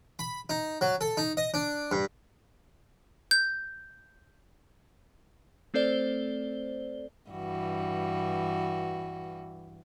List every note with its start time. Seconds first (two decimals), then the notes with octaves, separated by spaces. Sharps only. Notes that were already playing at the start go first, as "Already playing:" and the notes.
0.19 B5
0.50 D#4
0.81 F#3
1.01 A4
1.17 D#4
1.37 D#5
1.54 D4
1.92 G2
3.31 G6
5.74 A3 C4 A4 C5 D5 G7
7.30 G2 E3 F#4